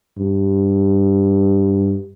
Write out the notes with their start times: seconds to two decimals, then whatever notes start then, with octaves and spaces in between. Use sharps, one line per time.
0.18 G2